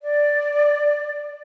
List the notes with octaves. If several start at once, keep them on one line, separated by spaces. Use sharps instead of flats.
D5